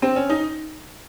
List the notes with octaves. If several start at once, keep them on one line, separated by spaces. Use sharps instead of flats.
C4
C#4
D#4